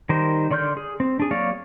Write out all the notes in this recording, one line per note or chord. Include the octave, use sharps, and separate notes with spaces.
D#3 G3 A#4 C5
D3 D5 C6 F6 G6
G#4
C4
D4 G#4
F#3 A#3 C#5 D5 F5